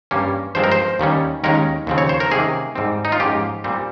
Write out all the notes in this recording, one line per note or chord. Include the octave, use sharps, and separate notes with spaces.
G2 G3 A#3 C#4
G2 F3 G#3 C4 C5
A#4
C5
D#2 D#3 G3 C#4
D#2 D#3 G#3 C#4 A#4
D#2 C#3 F3 C4
C#5
C5
A#4
C3 D#3 A#3 C#4 G#4
G#2 G3 C4
D#4
F4
G#2 F3 A#3 C#4 G4
A#2 G3 C4